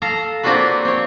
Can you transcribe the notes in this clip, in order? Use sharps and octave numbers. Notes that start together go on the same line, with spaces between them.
A4 F5 A#5
A#3 C4 D4 F4 F#4 B4
C4 C#5